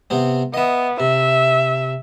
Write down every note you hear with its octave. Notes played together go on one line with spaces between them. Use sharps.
C3 B3 C4
B3 D#5 E5
C3 E5